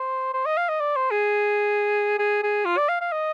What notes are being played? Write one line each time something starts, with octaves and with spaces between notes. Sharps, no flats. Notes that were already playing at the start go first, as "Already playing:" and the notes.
Already playing: C5
C5
D#5
F5
D#5
D5
C5
G#4
G#4
G#4
F4
D5
F5
F5
D#5